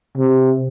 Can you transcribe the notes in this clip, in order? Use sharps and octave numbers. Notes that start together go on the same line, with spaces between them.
C3